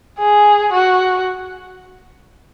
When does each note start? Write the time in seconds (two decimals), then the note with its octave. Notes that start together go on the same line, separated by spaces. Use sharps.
0.19 G#4
0.73 F#4